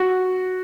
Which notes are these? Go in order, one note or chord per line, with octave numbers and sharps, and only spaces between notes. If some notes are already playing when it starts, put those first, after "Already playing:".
Already playing: F#4